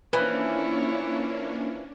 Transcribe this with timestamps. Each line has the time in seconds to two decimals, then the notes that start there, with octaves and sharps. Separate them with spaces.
0.13 E3 F3 A#3 C#4 D4 E4 B4 C#5